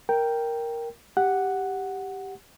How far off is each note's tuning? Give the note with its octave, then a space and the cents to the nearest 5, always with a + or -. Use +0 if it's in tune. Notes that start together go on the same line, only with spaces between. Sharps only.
A#4 +0 G5 +0
G4 +0 F#5 +0